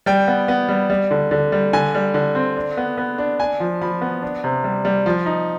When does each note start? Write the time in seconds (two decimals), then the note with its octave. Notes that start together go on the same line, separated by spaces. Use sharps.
0.06 G3 G5
0.28 B3
0.48 B3
0.69 G3
0.90 G3
1.11 D3
1.31 D3
1.52 G3
1.73 D3 G#5
1.94 G3
2.14 D3
2.35 C4
2.56 D4
2.77 B3
2.98 B3
3.18 D4
3.40 D4 G#5
3.60 F3
3.81 F3 B5
4.01 B3
4.22 D4
4.44 C3
4.64 G3
4.85 G3
5.06 F3
5.26 D#4